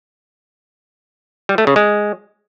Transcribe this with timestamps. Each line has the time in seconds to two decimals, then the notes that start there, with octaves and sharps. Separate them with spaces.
1.49 G3
1.58 A3
1.67 C#3
1.76 G#3